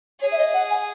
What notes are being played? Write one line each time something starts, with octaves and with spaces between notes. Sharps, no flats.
G#4 C#5
E5
D#5
F#5
G#5